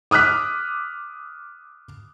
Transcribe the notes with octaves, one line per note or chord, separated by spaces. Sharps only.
D6 D#6 F6 F#6 B6